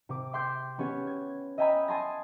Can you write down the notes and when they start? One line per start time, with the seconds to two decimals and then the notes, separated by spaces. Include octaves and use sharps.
0.09 C3 D6
0.33 E5 G5 C6 D6 G6
0.78 B3 C#4 G4 C#5
1.07 G#6
1.58 D#5 E5 G5 G#5 A#5 B5
1.88 G#5 A5 C6 D#6 G#6 A#6